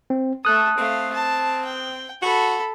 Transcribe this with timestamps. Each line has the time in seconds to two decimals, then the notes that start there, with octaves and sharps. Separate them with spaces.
0.10 C4
0.45 A3 A4 D#6 F#6
0.78 A3 C4 F5
1.14 A5
1.65 G5
2.22 F#4 A4 B5